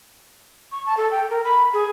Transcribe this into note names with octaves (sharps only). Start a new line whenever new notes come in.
C#6
A5
A4
G5
A#4
B5
G#4